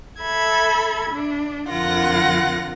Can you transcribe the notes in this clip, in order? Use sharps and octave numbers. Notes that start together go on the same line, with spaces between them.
A4 E5 B5 G#6
D4
F2 D3 F4 A#4 F#5 A#6